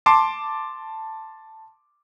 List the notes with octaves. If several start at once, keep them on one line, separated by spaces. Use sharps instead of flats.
A5 C6 D6